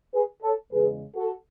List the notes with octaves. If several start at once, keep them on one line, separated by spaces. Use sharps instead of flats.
G#4 B4
A4 C#5
E2 C#3 G#3 G#4 B4
F#4 A4